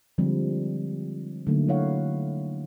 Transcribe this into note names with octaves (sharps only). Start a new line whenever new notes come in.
D3 F3 G3 G#3 C4
D3 F#3 A3 A#3 D#4
F#3 E4 C#5 F5 F#5